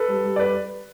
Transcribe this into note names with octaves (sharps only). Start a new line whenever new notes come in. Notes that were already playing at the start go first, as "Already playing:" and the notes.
Already playing: A4 B4
G3
G3
D5
B4